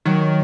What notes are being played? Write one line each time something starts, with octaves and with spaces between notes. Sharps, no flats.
D#3 F#3 F#4